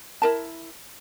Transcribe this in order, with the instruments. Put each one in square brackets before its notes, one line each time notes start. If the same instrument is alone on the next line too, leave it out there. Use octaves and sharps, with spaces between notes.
[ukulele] E4 A#4 A5